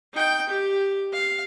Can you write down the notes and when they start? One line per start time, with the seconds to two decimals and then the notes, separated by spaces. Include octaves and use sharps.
0.13 D#4 G5
0.49 G4
1.13 F5